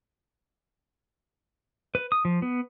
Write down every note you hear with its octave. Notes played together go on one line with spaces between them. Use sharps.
B4
D#6
F3
B3